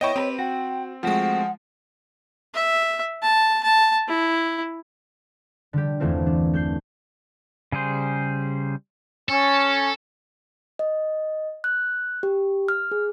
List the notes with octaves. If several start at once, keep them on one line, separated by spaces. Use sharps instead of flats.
B3 E4 C#5 D#5 G5 C#6
C4 G4 A#4 B4
F#4 G5
F3 G#3 A3 C4 F#4 F#5
E5
A5
A5
E4
D3 G3 G4
G1 E2 E3 A3 C4 F4
D4
A3 G6 C7
C#3 G3 G#4 C5
C#4 A4
D#5
F#6
G4
F6
G#4